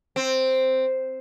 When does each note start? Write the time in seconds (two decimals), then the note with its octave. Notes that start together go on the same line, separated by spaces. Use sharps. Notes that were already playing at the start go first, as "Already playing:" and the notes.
0.16 C4